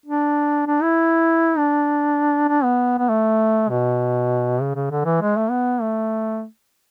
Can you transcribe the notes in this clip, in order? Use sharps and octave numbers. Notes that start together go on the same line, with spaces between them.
D4
D4
E4
D4
D4
B3
B3
A3
B2
C#3
C#3
D3
E3
G#3
A3
B3
A3